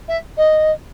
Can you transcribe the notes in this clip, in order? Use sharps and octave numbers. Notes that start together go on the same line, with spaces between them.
E5
D#5